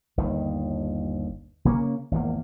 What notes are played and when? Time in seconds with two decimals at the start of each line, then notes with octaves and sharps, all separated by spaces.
0.17 G1 D#2 D#3
1.65 C#3 A#3 C#4
2.11 G#1 E2 D#3 A#3